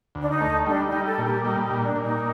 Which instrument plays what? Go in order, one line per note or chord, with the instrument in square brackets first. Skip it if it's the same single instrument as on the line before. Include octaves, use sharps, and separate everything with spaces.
[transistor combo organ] D2
[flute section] D4
D#4
[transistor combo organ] A3
[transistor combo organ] G3 [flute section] D4
[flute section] D#4
[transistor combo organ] G3
[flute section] A4
[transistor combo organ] A#2
[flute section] G4
[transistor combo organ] G3 [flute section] D#4
[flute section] D#4
[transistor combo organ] A#2
[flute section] D4
[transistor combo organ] A#2
[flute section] D#4